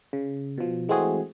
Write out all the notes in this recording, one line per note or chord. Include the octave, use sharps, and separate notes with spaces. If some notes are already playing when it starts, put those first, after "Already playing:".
C#3
B2 F3
E3 G#3 A3 C4 F#4 G#4